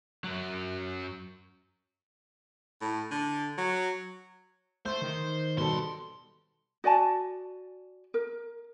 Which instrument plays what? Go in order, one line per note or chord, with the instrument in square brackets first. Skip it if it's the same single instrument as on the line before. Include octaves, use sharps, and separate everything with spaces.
[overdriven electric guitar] F#2 F#3
[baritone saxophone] A2
D3
F#3
[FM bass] A3 [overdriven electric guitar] C5 [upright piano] C6
[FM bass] D#3
[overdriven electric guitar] E2 C6 [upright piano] B2 G3 A4
[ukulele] F#4 D5 G#5 A5
A#4